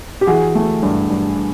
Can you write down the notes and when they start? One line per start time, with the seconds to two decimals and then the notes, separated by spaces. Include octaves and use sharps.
0.21 G4
0.27 E3 F#4 G#4
0.55 A3
0.83 G2
1.10 G2